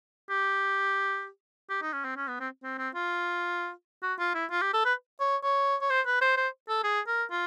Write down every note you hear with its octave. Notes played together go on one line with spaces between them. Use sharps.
G4
G4
D#4
C#4
C4
C#4
B3
C4
C4
C4
F4
F#4
F4
E4
F4
G4
A4
B4
C#5
C#5
C#5
C5
B4
C5
C5
A4
G#4
A#4
F4